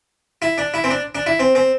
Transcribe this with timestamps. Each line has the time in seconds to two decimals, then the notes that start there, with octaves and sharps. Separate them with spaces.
0.42 E4
0.58 D4
0.74 E4
0.84 C4
0.90 D4
1.15 D4
1.26 E4
1.39 C4
1.55 C4